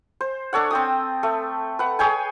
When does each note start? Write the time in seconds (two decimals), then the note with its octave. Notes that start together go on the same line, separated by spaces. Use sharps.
0.21 C5
0.53 D4 A4 C#5 F#5
0.71 C4 G5 D#6
1.23 A3
1.79 B4 F#5
1.99 G#4 C#5 G5 G#5